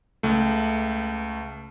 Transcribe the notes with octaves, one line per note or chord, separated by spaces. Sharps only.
C#2 A3